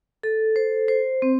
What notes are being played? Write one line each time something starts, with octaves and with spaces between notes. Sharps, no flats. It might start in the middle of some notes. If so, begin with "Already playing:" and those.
A4
C5
C5
C4